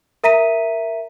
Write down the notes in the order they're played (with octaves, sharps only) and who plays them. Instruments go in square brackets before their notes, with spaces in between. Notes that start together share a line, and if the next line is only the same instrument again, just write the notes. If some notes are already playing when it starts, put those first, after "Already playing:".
[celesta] A#4 E5 A#5 B6 D#7